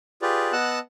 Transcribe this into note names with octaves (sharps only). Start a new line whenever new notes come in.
F4 G4 G#4 B4 D5
B3 D#5 F#5 A5 E6 F#6